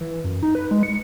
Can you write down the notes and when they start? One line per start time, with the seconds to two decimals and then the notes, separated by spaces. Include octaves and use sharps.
0.01 E3
0.24 F#2
0.43 D#4
0.55 B4
0.71 G#3
0.83 C#7